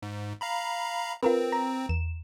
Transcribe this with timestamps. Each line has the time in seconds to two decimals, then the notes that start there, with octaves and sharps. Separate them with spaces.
0.02 G#2
0.41 F5 A#5 B5
1.23 C4 F4 A#4 B4
1.52 A#5
1.89 E2 E7